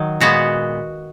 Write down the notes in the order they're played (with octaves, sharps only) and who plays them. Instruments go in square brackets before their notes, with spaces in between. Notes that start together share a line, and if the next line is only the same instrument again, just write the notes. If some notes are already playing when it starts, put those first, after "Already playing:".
Already playing: [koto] D#3 F#3
A#2 G#3 B3 F#4